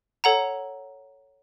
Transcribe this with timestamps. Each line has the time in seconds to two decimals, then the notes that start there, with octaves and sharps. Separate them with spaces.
0.24 A4 C#5 F#5 A#5